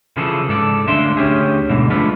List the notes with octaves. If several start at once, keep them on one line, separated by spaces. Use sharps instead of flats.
C#3 E3 F3 G#4 A4
G#2 A4 D5
D2 C#4 D4 E5 F5 C6
D2 C#4 G4 G#4
G#2 B2 D3 E3
D3 F3 G#3 A3 F4 B4